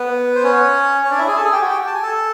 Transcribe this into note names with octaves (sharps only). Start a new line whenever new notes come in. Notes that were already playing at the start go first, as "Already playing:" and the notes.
Already playing: B3 B4
C5
C#4 C#5
C#5
D4 D5
E4 E5
G#4 G#5
A4 A5
G#4 G#5
G4 G5
F#4 F#5
G4 G5
A5
G#5
A4 A5